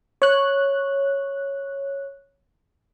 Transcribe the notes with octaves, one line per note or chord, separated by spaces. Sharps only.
C#5 F#6